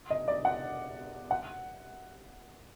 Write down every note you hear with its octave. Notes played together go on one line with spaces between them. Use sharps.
D#5
D5
F#5
F#5